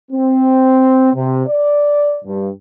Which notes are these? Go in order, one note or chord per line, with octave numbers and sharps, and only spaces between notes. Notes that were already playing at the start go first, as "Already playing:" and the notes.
C4
C3
D5
G2